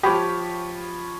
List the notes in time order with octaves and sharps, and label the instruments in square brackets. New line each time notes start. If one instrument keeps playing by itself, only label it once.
[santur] F3 C#5 B5 [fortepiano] G4